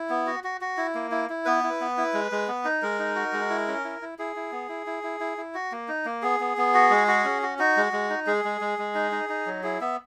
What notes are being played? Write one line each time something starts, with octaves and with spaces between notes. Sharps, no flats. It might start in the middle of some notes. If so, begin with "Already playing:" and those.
Already playing: E4
B3
F#4
F#4
F#4
E4
A#3
E4
E4
B3 B4
E4
B3
E4
G#3
G#3
B3
D#4
G#3 A#4
D#4
F#4
G#3
E4
C#4
E4
E4
E4 G#4
E4
B3
E4
E4
E4
E4
E4
F#4
A#3
D#4
A#3
B3 G#4
B3
B3
F#4
G#3
F#4
C#4
F#4
D#4 F#4
G#3
G#3
D#4
G#3 G#4
G#3
G#3
G#3
D#4
D#4
D#4
F#3
E4 G#4
B3 E5